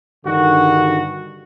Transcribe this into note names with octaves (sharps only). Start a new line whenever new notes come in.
G2 D3 D#3 F#4